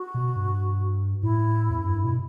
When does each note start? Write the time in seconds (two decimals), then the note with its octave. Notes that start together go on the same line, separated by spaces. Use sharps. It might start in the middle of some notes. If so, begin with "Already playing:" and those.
Already playing: F#4
0.14 B2
0.36 G2
1.23 A2 E4
1.70 E2
1.80 F#2
1.88 G2
2.05 B2